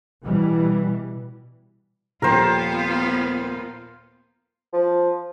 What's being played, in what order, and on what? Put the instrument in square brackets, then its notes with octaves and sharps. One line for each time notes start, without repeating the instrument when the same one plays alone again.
[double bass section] B2 E3 G3
[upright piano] D#1 F3 G5 [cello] B3 F4 [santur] A#4 C5
[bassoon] F3